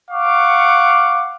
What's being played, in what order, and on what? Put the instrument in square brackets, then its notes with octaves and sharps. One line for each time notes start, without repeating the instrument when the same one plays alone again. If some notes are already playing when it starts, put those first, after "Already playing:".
[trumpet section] F5 F#5 C#6 D6